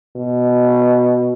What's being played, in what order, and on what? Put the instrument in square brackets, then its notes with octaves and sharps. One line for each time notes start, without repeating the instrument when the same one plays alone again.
[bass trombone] B2